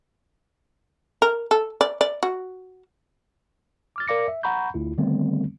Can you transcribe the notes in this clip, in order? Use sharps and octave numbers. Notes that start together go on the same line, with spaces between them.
A#4
A4
D5
D5
F#4
D6 F6 A6
A#4 D5 F5 D6 A#6 C#7
E5
F#5 A#5 B5 C#6 G6
D2 E4 F4
D3 D#3 G3 A3 B3 C4